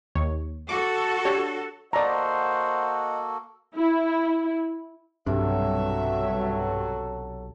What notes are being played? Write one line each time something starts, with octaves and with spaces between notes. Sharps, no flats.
D#2 C#5
F#4 A4 D6
D4 G4 C#5
A#3 F#4 A4 C5 D5 D#5 F#5 A#5
E4
B1 G2 C3 F#3 D4 A4 E5